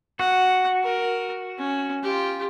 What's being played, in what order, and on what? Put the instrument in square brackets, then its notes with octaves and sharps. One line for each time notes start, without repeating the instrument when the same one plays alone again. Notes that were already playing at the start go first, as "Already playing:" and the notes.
[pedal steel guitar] F#4 [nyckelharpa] F#5
[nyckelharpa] A#4
C#4
F4 G4